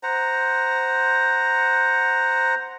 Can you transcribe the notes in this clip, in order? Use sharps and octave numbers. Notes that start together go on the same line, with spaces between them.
C5 F#5 A#5